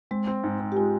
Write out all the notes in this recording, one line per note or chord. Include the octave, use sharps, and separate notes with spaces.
G#3 C4
C4
G#2
C4
G4
G#3 F4